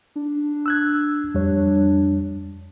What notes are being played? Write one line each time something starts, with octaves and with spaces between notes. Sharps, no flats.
D4
E6 F#6 G#6
F2 G3 C#5